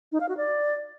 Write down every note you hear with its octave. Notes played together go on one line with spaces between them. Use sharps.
D#4
F5
F#4
D5